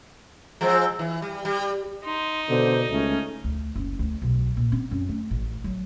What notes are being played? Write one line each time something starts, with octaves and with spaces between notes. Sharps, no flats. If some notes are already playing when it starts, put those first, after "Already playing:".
F3 G#3 C4
E3
G3
G3
D#4 C6
B2 D3 C5
C#2 A3 C#4
D2
F#1
D2
B1
A#2
C4
F#2
A3
A1
F#3